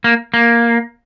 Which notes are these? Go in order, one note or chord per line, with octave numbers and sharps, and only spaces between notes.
A#3
A#3